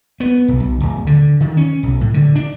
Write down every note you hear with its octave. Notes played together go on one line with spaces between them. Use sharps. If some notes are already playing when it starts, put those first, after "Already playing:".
B3
B1
B1
D1
D3
D#3
C#4
B1
A2
D3
D4